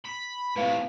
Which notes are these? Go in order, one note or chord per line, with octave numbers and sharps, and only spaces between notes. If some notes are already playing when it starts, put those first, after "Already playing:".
B5
A2 C3 B4 F5